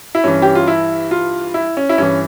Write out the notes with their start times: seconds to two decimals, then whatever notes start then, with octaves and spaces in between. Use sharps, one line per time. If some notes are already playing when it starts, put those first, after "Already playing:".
0.15 E4
0.24 G2 E3 C#4
0.42 G4
0.55 F4
0.68 E4
1.11 F4
1.54 E4
1.77 C#4
1.89 E4
1.98 G2 E3 C#4